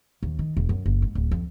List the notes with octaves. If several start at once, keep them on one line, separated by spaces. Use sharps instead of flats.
D#2
D#3
E1
F#2
F#1
G#2
D1
F2